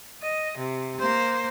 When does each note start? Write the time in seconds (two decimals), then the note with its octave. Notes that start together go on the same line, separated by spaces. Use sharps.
0.22 D#5
0.57 C3
0.99 A#3 C5